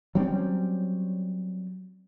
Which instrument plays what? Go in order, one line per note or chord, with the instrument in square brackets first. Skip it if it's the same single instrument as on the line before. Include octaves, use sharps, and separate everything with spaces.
[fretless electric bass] F#3 G3 C4 C#4